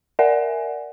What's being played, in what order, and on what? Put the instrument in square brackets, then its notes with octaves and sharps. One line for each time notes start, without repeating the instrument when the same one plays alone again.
[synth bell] A#4 D5 E5 F#5 G#5